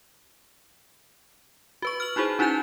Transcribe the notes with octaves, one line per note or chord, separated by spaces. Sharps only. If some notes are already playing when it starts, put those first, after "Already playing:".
F#4 B4 C#6
F6 F#7
D#4 E4 F#4 G#4 C5
C#4 D#4 E4 F#4 G#5 G6